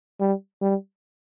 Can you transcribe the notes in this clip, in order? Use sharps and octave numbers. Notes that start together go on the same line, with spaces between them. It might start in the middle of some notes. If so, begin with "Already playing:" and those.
G3
G3